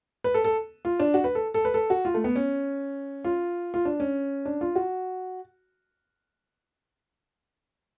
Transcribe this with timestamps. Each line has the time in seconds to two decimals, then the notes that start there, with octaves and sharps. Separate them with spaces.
0.24 B4
0.34 A4
0.44 A4
0.85 F4
1.00 D4
1.14 F#4
1.24 B4
1.35 A4
1.54 A4
1.65 B4
1.74 A4
1.90 F#4
2.05 F4
2.14 A3
2.24 B3
2.35 C#4
3.25 F4
3.74 F4
3.85 D4
4.00 C#4
4.45 D4
4.61 F4
4.75 F#4